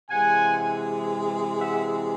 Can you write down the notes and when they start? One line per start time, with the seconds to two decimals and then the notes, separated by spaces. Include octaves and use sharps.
0.10 C3 E3 G#3 F#5 G#5
1.59 E5 F#5